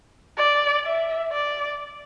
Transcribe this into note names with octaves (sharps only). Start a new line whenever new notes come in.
D5
E5
D5